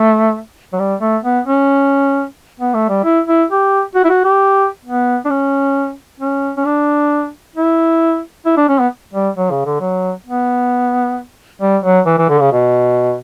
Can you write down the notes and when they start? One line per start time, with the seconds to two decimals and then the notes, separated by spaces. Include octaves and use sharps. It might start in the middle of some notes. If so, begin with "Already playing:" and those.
Already playing: A3
0.73 F#3
0.79 G3
1.01 A3
1.24 B3
1.46 C#4
2.60 B3
2.74 A3
2.89 G3
3.04 E4
3.28 E4
3.50 G4
3.95 F#4
4.04 E4
4.09 F#4
4.25 G4
4.85 B3
5.25 D4
5.30 C#4
6.20 C#4
6.57 C#4
6.65 D4
7.56 E4
8.46 E4
8.57 D4
8.69 C#4
8.80 B3
9.13 G3
9.37 F#3
9.51 C#3
9.66 D3
9.81 F#3
10.26 B3
11.62 G3
11.84 F#3
12.06 E3
12.19 E3
12.29 D3
12.41 C#3
12.52 B2